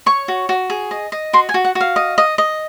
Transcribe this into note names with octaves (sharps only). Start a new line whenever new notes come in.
C#5 C#6
F#4
F#4
G#4
D#5
D#5
F#4 C6
G#5
F#4
F#5
F#4
F5
D#5
D#5
D#5